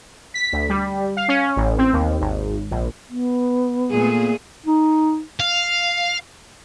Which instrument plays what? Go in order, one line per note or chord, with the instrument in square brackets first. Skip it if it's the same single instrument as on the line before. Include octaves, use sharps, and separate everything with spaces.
[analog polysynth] B6
D2
G3
F5
C#4
A1
C4
D#2
G#1
A#1
[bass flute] B3
[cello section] A#2 A3 G#4
[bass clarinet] D#4
[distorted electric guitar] F5